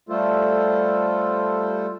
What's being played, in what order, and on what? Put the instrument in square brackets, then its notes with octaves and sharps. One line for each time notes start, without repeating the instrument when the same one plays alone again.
[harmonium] G3 A3 F4 A4 C5